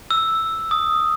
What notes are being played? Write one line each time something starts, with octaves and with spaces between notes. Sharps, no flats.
E6
D#6